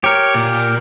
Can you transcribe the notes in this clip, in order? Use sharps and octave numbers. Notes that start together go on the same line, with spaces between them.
G4 A#4 C#5
A#2